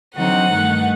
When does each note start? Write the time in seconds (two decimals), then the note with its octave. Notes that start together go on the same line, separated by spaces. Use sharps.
0.16 D3 F#3 C4 D#4 F#5
0.53 G2 D#3 A3 D#4